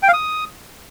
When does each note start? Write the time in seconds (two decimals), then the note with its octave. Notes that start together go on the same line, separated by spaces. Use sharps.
0.03 G5
0.08 F5
0.13 D#6